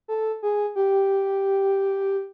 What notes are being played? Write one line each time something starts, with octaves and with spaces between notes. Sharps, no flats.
A4
G#4
G4